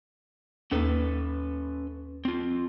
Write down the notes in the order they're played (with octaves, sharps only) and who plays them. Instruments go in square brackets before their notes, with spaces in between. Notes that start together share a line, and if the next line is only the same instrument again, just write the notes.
[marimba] D#2 A#3 [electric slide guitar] C#4 A4 B4
[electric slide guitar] C4 F4